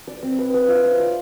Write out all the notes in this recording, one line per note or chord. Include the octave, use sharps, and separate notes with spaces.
D5
C4
B4
B4
F4
C5
D5